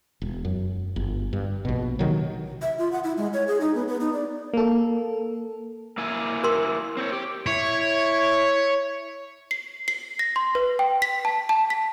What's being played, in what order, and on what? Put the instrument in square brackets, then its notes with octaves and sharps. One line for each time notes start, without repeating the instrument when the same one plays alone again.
[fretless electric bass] E1
F#2
G1
G2
A#1 B2
C3 D#3 F#3
[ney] E5
F4
F#5
E4
G#3
C#5
G#4
D#4
B3
B3
D#4
D5
[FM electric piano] A#3 A4
[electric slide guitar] A#3 E4 G#5
[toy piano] A#4 C6
[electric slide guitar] C4 C5 C#5
G4
[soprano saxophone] E4 [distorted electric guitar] C#5
[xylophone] C7
C7
A#6
C6
B4
G5
B6
A5
A5
B6